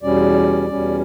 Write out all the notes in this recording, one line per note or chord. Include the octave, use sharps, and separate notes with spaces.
E2 B2 G3 C#4 D5
E2 B2 G3 C#4